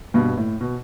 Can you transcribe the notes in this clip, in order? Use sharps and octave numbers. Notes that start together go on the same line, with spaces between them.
G2 B2
A2
B2